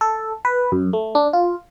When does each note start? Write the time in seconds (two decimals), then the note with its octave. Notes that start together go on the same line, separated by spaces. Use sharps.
0.01 A4
0.45 B4
0.72 F#2
0.93 A3
1.15 D4
1.33 F4